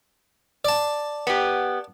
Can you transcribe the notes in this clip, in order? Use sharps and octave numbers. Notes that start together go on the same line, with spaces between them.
D5 A5
B3 G4